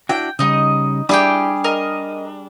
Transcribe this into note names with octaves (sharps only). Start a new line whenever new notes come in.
D4 E4 F#4 G5
C#3 G3 D#4 D#5
G3 D4 E4 G4 G#4 G5 D6
A#4 D#5